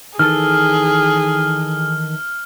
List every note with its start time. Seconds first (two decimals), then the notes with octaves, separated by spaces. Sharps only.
0.19 D#3 E3 G#4 A4 F6